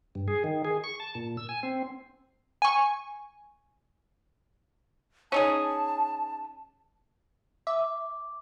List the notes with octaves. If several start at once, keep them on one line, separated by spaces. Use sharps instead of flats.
G2
G#4
D#3
G#4
C#6
A5
A#2
E6
G#5
C4
G#5 C#6
C#4 D#4 G#4 A5
E5 D6